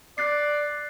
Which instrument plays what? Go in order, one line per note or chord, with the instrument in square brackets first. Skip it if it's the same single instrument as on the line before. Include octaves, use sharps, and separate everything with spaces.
[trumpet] D5 [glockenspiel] F#6 A6 C7